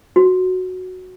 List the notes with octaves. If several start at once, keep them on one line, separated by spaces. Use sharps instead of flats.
F#4